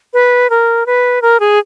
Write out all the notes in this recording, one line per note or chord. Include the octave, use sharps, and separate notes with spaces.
B4
A#4
B4
A#4
G#4